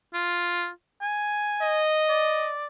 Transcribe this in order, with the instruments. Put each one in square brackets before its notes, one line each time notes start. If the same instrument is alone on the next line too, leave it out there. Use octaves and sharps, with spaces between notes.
[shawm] F4
G#5
[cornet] D#5
[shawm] D5